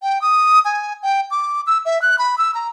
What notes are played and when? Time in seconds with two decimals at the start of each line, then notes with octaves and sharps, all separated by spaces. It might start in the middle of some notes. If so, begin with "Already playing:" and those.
0.03 G5
0.22 D#6
0.65 G#5
1.03 G5
1.31 D6
1.67 E6
1.85 E5
2.02 F#6
2.19 B5
2.38 E6
2.55 A#5